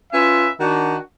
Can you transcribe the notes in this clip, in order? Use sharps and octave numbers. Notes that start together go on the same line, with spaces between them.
C#4 F4 B4 E5
D#3 D4 F#4